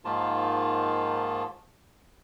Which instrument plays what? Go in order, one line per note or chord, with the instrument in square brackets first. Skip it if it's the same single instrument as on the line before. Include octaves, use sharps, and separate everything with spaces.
[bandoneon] G#2 D#3 F3 A#3 F4 A5